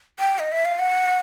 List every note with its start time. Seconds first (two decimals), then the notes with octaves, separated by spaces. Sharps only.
0.19 G5
0.39 D#5
0.52 E5
0.65 F5
0.79 F#5